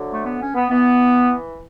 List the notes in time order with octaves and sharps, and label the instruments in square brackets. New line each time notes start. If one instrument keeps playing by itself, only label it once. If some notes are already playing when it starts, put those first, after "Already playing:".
Already playing: [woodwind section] D2 D3 F#3
A3
B3
C#4
B3
E3 B3